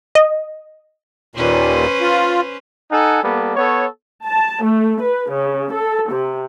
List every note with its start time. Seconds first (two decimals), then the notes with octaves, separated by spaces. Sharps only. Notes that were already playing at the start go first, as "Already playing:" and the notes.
0.15 D#5
1.35 D#2 A#2 C#4 B4 C5
2.01 F4
2.91 D#4 A4 F#5 G#5
3.22 G3 A#3 B3 A4
3.55 B3 A4 C#5
4.26 A5
4.65 A3
5.02 B4
5.32 C#3
5.74 A4
6.11 C3